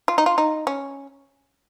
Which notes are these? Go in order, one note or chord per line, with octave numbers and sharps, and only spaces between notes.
F4
D#4
F4
D#4
C#4